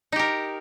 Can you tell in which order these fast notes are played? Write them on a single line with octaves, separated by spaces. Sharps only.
D#4 G4 A#4